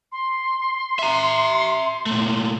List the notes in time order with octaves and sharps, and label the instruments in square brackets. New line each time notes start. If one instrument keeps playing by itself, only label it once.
[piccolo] C6
[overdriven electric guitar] E5 A#5
A#2 A3